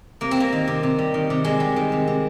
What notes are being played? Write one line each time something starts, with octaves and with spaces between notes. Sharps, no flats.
C3 A#3
C4
G3 A#3
D#3
C3
C3
G3
D#3
C3
C3 G#3
G3
D#3
C3
C3